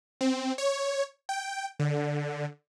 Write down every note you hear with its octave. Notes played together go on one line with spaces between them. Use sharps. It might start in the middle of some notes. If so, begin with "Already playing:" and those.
C4
C#5
G5
D3